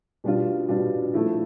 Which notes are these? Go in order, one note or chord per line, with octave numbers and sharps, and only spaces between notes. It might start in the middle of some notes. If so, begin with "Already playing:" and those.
B2 G3 D4 F4
B2 G3 D4 F4
F3 A3 E4